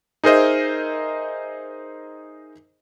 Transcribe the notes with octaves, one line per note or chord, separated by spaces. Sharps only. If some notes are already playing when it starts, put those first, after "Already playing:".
D#4 G#4 A#4 C5 D#5 E5